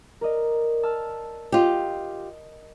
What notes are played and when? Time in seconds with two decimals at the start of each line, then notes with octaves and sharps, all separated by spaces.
0.21 A#4 D5 D#5
0.83 A5 E6 F6
1.52 F4 G4 D#5